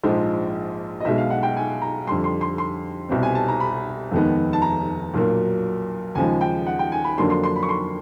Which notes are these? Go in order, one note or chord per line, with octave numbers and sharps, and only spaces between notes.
A#1 G#2 F3 G#3
D#5
B1 B2 G#3 E5
F5
F#5
G5
G#5
A#5
F2 D3 G3 C6
C6
C6
C6
C2 B2 G3 C4
G#5
A5
A#5
B5
F1 D#2 D#3 G#3 B3
A5
A#5
B1 A#2 F#3 A#3
D#2 C#3 F3 G#3 G#5
G5
F#5
G5
G#5
B5
F2 D3 F#3 A#3 D4 C6
C6
C6
B5
C#6
C6